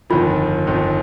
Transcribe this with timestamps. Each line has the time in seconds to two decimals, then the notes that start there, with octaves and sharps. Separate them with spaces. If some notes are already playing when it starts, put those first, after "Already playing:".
0.10 G1 F2 D#3 F4
0.67 G1 F2 D#3